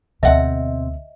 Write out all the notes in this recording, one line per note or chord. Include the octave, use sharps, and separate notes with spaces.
D2 B2 C4 A4 D#5 E5 F#5